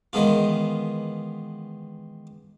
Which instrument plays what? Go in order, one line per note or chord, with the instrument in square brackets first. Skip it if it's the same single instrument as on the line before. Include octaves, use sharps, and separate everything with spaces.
[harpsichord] D#3 E3 G#3 B3 F4